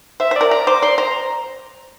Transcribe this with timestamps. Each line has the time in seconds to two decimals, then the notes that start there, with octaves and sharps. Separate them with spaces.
0.20 C5 E5
0.31 C5
0.36 A#4 D5
0.51 D5 A#5
0.67 C5 D6
0.82 D5 C6
0.98 C5 A#5